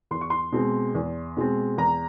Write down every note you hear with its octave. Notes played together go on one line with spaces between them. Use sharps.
E2 C6
C#6
C6
B2 G#3 C4
E2
B2 G#3 C4
E2 A#5